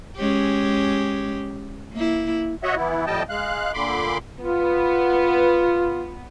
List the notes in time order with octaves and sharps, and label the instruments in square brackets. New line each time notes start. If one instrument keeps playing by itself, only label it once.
[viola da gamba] G#3 C#4 G4
A#3 E4
[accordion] F#4 C#5 D#5 E5 F#5
E3 B3 E4
F2 A2 G3 D#5 G5 A5
G#3 F5 F#6
A#2 D3 B5 C6 D6
[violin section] B3 [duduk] F4